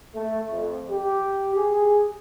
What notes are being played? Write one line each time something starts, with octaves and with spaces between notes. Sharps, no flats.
A3
F2
G4
G#4